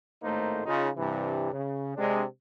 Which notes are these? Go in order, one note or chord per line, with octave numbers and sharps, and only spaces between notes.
G#1 A2 A3 A#3 D#4 C5
C#3 D#4 F4
G2 C3 E3
C#3
C3 G#3 D4